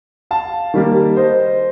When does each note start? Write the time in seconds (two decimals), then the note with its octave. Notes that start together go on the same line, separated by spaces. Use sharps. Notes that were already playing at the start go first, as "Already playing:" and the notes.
0.31 F5 A5
0.74 D#3 G3 A#3
1.16 C5 D#5